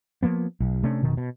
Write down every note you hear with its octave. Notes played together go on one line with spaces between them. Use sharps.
F3 A#3 B3
B1
C3 A3 C#4 D4
F1 B2 D#3
B2